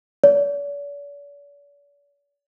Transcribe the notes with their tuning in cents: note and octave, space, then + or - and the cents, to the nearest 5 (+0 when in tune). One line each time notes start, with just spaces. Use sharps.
D5 -45